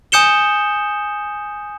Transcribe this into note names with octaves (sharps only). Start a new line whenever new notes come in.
G#5 D#6 G6 C#7 E7 G7